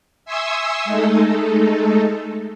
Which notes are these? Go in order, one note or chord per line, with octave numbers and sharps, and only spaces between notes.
E5 G#5 C6 C#6 D#6 E6
G#3 A3 D#4 A4